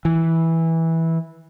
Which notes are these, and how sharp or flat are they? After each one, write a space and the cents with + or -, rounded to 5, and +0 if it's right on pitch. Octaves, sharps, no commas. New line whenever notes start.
E3 -10